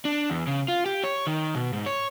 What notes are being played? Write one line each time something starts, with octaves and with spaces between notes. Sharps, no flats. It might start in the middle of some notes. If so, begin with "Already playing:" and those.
D4
E2
C#3
F4
G4
C#5
D#3
B2
G#2
C#5